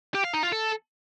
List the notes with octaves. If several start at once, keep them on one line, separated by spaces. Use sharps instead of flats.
G4
F5
D#4
F4
A4